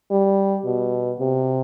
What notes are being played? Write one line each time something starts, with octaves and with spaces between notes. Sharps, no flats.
G3
B2
C3